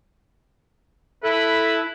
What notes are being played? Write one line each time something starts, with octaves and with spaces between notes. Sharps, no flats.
E4 A4 B4